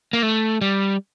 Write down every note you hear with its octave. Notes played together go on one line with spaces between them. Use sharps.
A#3
A3
G3